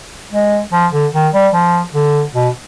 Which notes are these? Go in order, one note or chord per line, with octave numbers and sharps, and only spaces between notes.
G#3
F3
D3
D#3
G3
F3
D3
B2